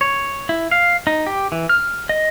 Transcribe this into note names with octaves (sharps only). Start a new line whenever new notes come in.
C#5
E4
F5
D#4
G4
E3
F6
D#5